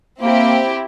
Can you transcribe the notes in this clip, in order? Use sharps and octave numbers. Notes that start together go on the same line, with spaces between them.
A#3 C4 E4 G4